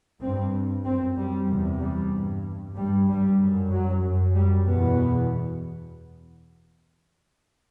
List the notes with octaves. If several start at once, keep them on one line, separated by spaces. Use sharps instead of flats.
G2 C4
F#2 C4
G3
E2 C3
G3
G2
G2 G3
G3
F#2
F#3
F#2
G3
E2 B2 B3